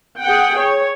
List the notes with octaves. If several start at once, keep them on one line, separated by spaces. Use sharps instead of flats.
G#4 F#5 G5
C#5